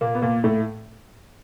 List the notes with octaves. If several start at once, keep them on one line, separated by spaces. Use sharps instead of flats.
A#2 A#3
B3
A#2 A#3
A2 A3